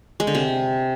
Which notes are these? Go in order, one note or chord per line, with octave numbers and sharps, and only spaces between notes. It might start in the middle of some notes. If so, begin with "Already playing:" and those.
G#3
D3
C3